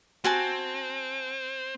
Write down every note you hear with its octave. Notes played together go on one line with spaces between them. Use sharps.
C4 F#4 G#5 A5